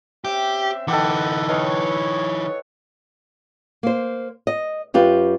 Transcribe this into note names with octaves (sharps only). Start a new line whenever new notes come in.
C4 C#4 G4 E5
E3 D#4 A4 B4 D#5 F#5 G5 D6
B4 C#5 D#5 F5
A#3 C5
D#5
F#2 F4 G4 B4